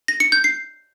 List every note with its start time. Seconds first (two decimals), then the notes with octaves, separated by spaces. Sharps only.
0.08 A#6
0.20 C#7
0.32 G6
0.44 C7